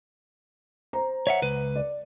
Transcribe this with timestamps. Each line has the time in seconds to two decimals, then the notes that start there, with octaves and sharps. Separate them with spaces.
0.93 C5 A#5
1.27 C#5 E5 F#5
1.42 C#2 B4
1.76 D5